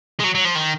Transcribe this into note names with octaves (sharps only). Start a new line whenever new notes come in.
G#3
F#3
F#3
F3
D#3